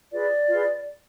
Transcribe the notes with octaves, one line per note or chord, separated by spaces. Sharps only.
F4 G#4 B4 D5
F4 G#4 B4